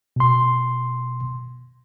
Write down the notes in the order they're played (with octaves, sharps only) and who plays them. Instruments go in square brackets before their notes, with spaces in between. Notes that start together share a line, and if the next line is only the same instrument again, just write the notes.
[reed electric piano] B2 C6